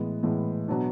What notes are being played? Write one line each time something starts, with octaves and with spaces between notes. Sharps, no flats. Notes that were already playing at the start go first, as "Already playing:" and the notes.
Already playing: A2 E3 G#3 B3
A2 E3 G#3 B3
B2 F#3 B3 D4